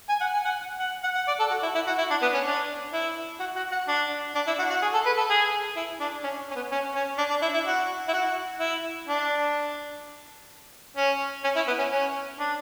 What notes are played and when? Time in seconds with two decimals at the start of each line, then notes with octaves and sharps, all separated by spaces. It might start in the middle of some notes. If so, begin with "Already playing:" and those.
0.09 G#5
0.21 F#5
0.34 G#5
0.45 F#5
0.80 F#5
1.04 F#5
1.15 F#5
1.28 D5
1.40 A4
1.51 F#4
1.63 E4
1.75 E4
1.87 F#4
1.98 E4
2.11 D4
2.22 B3
2.34 C#4
2.46 D4
2.93 E4
3.40 F#4
3.56 F#4
3.72 F#4
3.88 D4
4.35 D4
4.47 E4
4.59 F#4
4.70 F#4
4.82 G#4
4.94 A4
5.06 B4
5.17 A4
5.30 G#4
5.76 E4
6.00 D4
6.24 C#4
6.51 C#4
6.56 B3
6.72 C#4
6.95 C#4
7.18 D4
7.30 D4
7.42 E4
7.54 E4
7.66 F#4
8.09 E4
8.14 F#4
8.60 E4
9.08 D4
10.97 C#4
11.44 C#4
11.56 E4
11.68 B3
11.79 C#4
11.91 C#4
12.39 D4